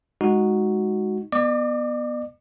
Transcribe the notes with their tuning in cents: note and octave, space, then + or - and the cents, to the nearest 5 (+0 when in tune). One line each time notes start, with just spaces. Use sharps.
G#3 +0 D#4 +0 F#4 +0
B3 -15 D5 +45 D6 +0